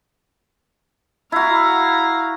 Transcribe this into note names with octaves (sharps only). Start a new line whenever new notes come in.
E4 F#4 F5 A#5